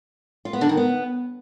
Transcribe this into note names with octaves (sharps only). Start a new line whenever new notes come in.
F4
B3
D3
D#3
B3